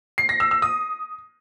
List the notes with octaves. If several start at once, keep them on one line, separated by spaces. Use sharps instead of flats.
C7
A#6
E6
E6
D#6